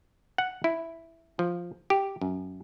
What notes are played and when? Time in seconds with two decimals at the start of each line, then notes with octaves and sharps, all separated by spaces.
0.38 F#5
0.64 E4
1.39 F3
1.90 G4
2.21 F#2